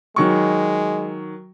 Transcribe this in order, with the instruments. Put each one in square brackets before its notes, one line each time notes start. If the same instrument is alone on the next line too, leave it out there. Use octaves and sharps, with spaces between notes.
[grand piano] D#3 F#3 C#6 [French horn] G#3